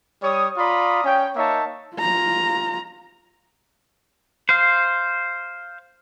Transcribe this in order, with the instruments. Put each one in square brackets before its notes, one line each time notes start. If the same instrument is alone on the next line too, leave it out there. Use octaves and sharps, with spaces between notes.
[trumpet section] G3 C#5 D#6
F4 D5 A#5 B5 D#6
C#4 G5
A#3 D#4 C#5 E5 A5
[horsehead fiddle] F4 A#5
[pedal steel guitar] C5 F5